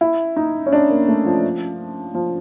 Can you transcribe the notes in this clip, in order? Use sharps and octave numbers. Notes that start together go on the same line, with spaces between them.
E4
D#4
C#4
D4
A#3
A3
F3
F3